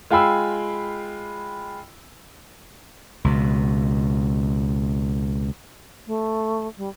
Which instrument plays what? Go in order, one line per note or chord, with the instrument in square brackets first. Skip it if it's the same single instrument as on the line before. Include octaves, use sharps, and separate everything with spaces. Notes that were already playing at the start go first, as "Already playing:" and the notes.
[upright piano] G#3 F4 G5 G#5 B5 E6
[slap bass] C#2 B2
[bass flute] A3
G3